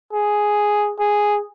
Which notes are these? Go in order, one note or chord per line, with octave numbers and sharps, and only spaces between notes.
G#4
G#4